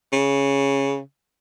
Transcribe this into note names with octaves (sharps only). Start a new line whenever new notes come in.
C#3